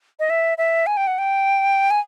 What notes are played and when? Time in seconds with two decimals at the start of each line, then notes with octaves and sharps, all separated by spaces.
0.20 D#5
0.30 E5
0.58 E5
0.87 G#5
0.97 G5
1.07 F#5
1.18 G5
1.91 G#5